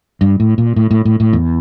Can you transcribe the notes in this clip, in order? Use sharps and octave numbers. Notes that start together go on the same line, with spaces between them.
G2
A2
A#2
A2
A2
A2
A2
E2